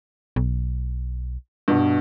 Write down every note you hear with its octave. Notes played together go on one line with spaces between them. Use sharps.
B1
G2 B2